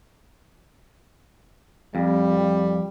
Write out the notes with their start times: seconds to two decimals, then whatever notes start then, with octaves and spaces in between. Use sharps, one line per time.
1.95 F2 G3